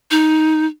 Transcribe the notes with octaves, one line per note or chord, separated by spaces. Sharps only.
D#4